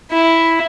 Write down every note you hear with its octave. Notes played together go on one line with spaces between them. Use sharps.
E4